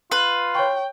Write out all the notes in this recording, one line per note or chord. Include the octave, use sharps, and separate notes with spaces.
F4 B4
C#5 G5 C#6